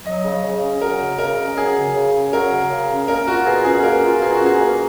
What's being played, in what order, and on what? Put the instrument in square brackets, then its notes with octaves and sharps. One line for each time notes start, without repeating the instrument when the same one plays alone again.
[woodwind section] F#3 [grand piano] D#5
[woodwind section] C#3
C#3
C#4
[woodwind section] F#3 [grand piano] A#4
[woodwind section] C#3
[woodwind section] C#3 [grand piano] A#4
[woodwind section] C#4
[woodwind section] F#3 [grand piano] G#4
[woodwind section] C#3
C#3
C#4
[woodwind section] F#3 [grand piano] A#4
[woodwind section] C#3
C#3
C#4
[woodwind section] A#3 [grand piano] A#4
[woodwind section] F4 [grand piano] F#4
[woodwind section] B2 [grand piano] G#4
[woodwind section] C#4 [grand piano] G#4
[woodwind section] A#3 [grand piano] A#4
[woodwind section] F4
[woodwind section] B2 [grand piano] G#4
[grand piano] F#4
[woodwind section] C#4
[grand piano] G#4
[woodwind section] A#3